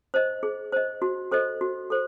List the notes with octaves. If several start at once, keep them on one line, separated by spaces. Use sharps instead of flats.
C5 D#5
G#4
C5 D#5
F#4
A4 C5 D#5
F#4
A4 C5